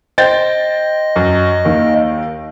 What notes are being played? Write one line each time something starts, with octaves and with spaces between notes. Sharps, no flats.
C5 D#5 G5 A6
F#2
D#2 D#3